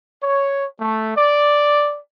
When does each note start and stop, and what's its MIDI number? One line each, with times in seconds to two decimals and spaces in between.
0.22 0.65 73
0.80 1.16 57
1.16 1.99 74